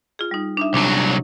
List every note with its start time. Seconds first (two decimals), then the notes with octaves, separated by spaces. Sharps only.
0.19 F4 G#4
0.31 G3 D#4
0.57 D4 D#4 E5
0.74 C2 F#3 D4